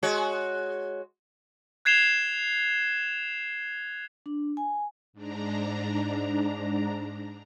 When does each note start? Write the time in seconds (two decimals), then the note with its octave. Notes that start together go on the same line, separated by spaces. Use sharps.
0.03 G#3 F#4 C#5
1.85 F#6 G#6 C7 E7 F7 G7
4.26 D4
4.57 G#5
5.13 G#2 D4 A#5